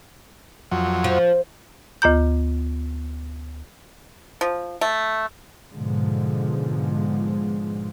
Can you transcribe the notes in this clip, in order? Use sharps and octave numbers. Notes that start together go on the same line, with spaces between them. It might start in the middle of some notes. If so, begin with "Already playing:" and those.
F2 F#3
F3
D2 F4 A#5 G6
F3
A3
G#2 B2 D3 F3 G#3